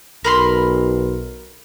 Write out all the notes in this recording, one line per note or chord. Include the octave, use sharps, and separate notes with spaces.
B1 A#4 B5 C6